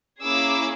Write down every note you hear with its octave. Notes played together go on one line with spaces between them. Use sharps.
A#3 C#4 E4 G#4 D6 E6